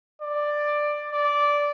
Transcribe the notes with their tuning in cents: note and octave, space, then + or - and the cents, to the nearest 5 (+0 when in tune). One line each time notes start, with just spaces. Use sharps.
D5 +10
D5 -10